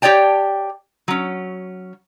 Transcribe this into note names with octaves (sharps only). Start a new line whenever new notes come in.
G4 C#5 D5 G5 A5
F#3 C#4